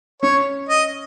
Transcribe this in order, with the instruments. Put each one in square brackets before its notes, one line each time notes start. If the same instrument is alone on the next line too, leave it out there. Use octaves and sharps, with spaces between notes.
[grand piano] C#4 [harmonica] C#5
[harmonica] D#5